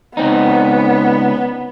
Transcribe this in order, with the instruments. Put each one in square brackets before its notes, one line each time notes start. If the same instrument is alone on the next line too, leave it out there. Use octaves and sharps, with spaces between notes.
[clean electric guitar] C#2 C4 D#4 [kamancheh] B3